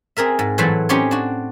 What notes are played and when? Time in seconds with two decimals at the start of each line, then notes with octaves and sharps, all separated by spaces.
0.17 C4 G#4 A#4 E5
0.39 G#2
0.58 A2 E3 F#3 C5 A5 B5
0.89 C4 C#4 D#4 G4 C5 C#5
1.11 D4 F#4